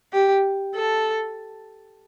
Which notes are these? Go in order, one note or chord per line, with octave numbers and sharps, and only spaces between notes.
G4
A4